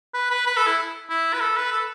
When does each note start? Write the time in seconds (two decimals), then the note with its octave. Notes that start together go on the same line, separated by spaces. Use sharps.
0.14 B4
0.31 B4
0.47 B4
0.57 A4
0.67 E4
1.10 E4
1.34 B4
1.41 A4
1.57 B4
1.72 A4